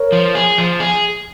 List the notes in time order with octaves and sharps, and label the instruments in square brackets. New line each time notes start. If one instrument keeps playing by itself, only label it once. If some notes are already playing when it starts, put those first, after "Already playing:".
Already playing: [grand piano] A#4 C#5
[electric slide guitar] F3
G#4
F3
G#4